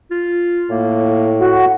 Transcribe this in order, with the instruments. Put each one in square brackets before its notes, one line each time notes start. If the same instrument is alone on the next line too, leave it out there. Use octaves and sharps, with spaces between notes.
[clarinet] F4
[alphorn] A2 [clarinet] A#3
[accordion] F#4